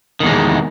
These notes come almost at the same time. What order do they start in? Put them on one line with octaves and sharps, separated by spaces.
D#3 E2 G#3